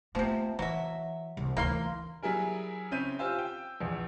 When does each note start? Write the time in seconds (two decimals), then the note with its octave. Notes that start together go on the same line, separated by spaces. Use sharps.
0.15 C3 F3 A3 B3
0.59 E3 F#3 E5
1.37 C2
1.57 D2 E3 A#3 F5 C6
2.22 F#3 G3 E4 G#4 A#4
2.91 C#3 C4 E4 C#5 G6 D#7
3.19 F4 G4 C5 G#5 E6
3.39 G5
3.80 A#1 E2